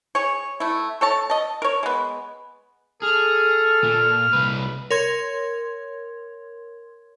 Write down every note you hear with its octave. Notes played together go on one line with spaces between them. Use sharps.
G#4 C#5
A3 E4
A4 C#5 A5
D#5 A5
A#4 C#5
G#3 B3
G#4 A4 F6
A#2
C2 B4
A#4 C#5 C6 G#6